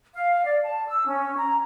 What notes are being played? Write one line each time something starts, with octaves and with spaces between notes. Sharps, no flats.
F5
D5
A5
E6
C#4
A#5